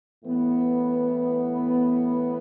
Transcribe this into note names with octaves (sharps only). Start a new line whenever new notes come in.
A2 E3 B3